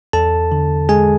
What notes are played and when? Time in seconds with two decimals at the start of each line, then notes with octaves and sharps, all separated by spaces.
0.13 E2 A4 A5
0.52 D3
0.89 G#3 G#4 G#5